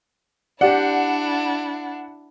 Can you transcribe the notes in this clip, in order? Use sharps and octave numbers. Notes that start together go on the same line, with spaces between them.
D4 E4 G4 D5 F#5